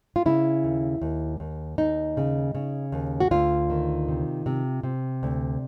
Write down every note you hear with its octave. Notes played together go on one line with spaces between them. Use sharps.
F4
C#3 E4
D#2
D#2
D#2
D#2 D#4
C#3
C#3
D#2
F#4
D2 F4
D#3
C3
C3
C3
D2